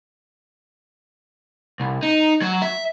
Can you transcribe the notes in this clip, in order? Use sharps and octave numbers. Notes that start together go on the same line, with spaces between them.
C2
D#4
F#3
E5